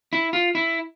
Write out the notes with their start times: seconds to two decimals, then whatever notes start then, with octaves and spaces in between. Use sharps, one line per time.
0.13 E4
0.33 F4
0.55 E4